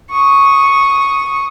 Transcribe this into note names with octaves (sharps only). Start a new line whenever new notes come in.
C#6 D#6